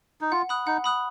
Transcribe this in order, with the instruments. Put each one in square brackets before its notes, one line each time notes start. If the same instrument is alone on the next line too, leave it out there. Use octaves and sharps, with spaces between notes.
[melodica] D#4
[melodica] F4 [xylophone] F#5
[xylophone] B5 D#6 F#6
[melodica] D#4 [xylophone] F#5
[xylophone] B5 D#6 F#6